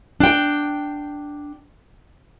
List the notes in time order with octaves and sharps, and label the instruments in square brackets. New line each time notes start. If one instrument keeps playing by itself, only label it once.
[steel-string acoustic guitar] D4 G5